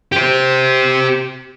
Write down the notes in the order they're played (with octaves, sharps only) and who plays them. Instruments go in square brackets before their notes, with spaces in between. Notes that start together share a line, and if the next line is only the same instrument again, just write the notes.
[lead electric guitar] G4 C5